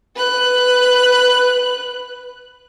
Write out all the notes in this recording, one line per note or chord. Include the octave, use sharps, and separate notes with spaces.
B4 F#6